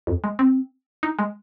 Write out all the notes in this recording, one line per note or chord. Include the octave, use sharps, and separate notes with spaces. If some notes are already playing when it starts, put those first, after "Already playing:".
F2
G#3
C4
D#4
G#3